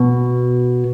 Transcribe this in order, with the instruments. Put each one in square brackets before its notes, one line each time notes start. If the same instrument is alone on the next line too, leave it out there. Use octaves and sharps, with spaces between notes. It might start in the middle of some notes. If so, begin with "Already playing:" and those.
Already playing: [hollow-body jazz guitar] B2